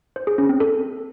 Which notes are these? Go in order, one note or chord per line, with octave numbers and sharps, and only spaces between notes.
C5
G#4
C#4
C4
A4